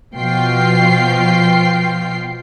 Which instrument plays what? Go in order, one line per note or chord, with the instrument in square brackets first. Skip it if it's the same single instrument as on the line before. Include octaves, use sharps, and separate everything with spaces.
[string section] B2 F3 F4 G5 C7